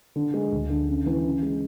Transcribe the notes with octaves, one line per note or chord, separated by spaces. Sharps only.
D3
G#3
D2
D3
C#3
E3
C#3
G#3